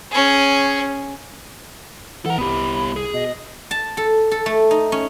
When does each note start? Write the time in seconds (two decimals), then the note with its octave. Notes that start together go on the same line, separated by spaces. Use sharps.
0.11 C#4 G#4
2.26 E3 A4 F#5 A#5
2.38 C2 B3 G4 B5
2.96 G#4
3.14 B2 D#5
3.71 A5
3.97 A4
4.31 A4
4.46 A3
4.71 D#4
4.92 C#4